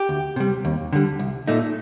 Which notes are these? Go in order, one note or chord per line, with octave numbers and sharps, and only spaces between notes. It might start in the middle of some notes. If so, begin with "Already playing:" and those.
Already playing: G4
D2
C3 G3
D#2
D3 G3
C2
A#2 A3 D#4